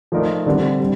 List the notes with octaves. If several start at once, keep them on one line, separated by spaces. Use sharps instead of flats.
F3 A3 D#4 A#4 D5
D3 G3 C4 G4
G3